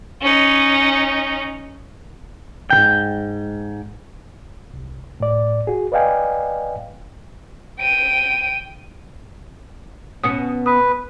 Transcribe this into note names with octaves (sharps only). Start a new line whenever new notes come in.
C#4 D#4
G#2 D#3 G5
C2
A2 D5
F#4 G#4
B4 D5 D#5 F5 G5 G#5
G5 D#7
B2 B3 C#4 D#6 C#7
B4 D#6